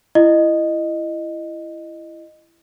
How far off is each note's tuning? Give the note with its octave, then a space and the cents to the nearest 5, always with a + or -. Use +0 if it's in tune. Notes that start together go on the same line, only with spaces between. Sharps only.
E4 +25 D#5 -15